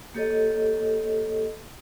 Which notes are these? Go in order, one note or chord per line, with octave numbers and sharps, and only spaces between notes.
A#3 G4 A4 C#5 D#5